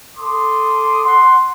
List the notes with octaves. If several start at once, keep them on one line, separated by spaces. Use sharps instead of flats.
A4 C6 D6 D#6
F#5 C6